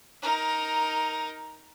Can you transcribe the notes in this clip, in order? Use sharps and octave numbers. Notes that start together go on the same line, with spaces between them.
D#4 A#4